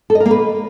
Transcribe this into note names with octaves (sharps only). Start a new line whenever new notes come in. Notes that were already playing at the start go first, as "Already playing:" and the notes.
A4
D#5
A#4
A#3
B4